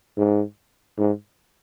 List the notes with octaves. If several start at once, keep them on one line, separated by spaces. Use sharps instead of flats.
G#2
G#2